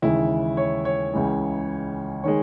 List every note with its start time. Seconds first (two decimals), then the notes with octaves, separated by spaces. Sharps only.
0.02 D#2 C#3 E3 G#3 E4
0.57 C#5
0.85 C#5
1.13 C#2 C#3 E3 G#3
2.24 D#3 G#3 C#5